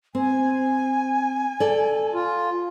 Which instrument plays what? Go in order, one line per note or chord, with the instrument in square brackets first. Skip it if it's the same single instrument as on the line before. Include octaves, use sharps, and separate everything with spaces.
[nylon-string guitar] C4 [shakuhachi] G#5
[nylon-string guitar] A4 D5
[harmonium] F4